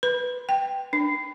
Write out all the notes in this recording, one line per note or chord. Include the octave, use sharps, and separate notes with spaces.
B4
G5
D4